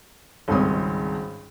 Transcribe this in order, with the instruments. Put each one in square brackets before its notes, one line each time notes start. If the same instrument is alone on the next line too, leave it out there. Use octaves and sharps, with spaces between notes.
[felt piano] G#1 C#2 G3 C4 C#4 D#6